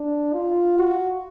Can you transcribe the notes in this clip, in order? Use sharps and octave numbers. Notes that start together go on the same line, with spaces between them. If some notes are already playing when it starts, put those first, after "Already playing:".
Already playing: D4
F4
F#4